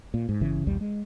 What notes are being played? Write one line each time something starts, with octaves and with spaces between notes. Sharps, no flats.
A#2
G#2
G1 C#3 E3
A#1 D#2 G3
G#3